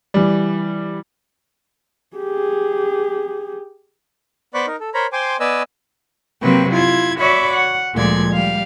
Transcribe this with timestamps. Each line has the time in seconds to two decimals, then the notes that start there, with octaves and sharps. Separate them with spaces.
0.14 E3 G3
2.17 G4 G#4
4.54 B3 C5 D5 B5 C#6 F#6
4.67 D#4 A#4
4.80 A4
4.94 A#4 C5 C#5 A#5 B5
5.13 C5 G5 G#5 C6 D6
5.40 B3 B4 D5 D#5 G#5 E6
6.40 C3 F#3 A#3 C4 B4
6.71 E4 F4 G#6
7.17 F#4 C#5 D5 E5 B5
7.52 F#5
7.92 D2 A#2 F3 G#3 D5 G#6
8.32 G3 F5